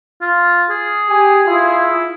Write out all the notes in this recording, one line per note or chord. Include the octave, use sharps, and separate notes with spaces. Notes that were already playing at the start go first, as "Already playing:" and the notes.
F4
G#4
G4 G#5
E4 F4